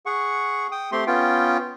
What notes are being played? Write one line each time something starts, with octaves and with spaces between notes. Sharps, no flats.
G#4 F#5 C#6
G5 D#6
A3 C4 G4 C6
B3 C#4 F4 G5